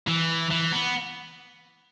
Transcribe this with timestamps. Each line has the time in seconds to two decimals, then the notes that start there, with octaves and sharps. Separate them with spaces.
0.07 E3
0.50 E3
0.72 B3